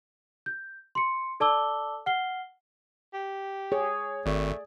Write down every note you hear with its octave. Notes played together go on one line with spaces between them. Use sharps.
G6
C6 C#7
A4 D5 A5 D6 E6 G7
F#5 F6 C7 G7
G4
G#4 C#5
G#1 A3 D5